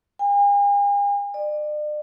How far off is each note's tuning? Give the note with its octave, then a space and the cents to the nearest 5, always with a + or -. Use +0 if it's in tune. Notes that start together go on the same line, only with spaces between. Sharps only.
G#5 -45
D5 +40